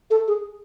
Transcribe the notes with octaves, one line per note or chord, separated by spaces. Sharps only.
A4
G#4